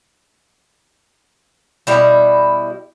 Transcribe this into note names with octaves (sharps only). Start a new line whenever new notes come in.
B2 G3 E4